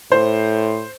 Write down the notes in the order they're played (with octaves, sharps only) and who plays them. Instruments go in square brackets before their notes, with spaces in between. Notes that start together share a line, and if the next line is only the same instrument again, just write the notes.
[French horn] A2 [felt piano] C5